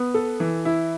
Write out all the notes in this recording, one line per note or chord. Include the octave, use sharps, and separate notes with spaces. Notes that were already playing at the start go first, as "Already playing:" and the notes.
Already playing: B3
A4
E3
E4